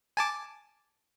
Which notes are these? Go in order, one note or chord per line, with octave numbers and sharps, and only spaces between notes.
G#5 A5 D6